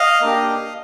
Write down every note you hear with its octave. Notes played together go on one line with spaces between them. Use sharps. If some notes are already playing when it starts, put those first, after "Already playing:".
Already playing: D#5 F5
A#3 D4 G4